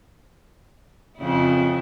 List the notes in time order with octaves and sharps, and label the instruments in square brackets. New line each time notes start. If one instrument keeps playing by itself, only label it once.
[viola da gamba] F2 C#3 E4